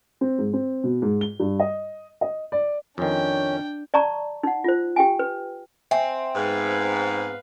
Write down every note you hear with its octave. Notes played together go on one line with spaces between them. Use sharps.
C4
G#2
C4
B2
G#2
G7
G2
D#5
D#5
D5
F2 D#3 C#4 D4 G5
D5 A5 A#5 C#6
D#4 F#5
F4 C5
G4 G5 G#5
B4
C4 E5 F#5 G#5
G#2 B3 B4 F5